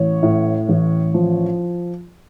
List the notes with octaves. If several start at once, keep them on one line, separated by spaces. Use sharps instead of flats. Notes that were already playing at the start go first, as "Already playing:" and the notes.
Already playing: A1 C#5
A2
A1
F3